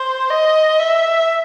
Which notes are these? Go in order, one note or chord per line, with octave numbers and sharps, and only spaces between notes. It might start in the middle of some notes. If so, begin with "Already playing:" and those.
Already playing: C5
D#5
E5